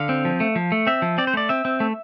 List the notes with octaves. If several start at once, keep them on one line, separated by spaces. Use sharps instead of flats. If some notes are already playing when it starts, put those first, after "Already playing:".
Already playing: D3 F5
C4
F3
A3
F3
A3
C4 E5
F3
C4 D5
C5
A3 D5
C4 E5
C4
A3